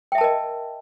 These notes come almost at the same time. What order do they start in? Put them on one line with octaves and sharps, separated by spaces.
G5 E5 A5 A#4 D#5